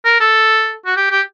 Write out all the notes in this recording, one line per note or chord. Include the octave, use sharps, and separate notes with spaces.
A#4
A4
F#4
G4
G4